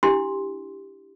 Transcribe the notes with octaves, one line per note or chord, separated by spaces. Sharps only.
D4 E4 G4 C6